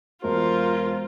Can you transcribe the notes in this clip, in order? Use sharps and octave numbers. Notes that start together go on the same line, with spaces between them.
E1 F4 A#4 C5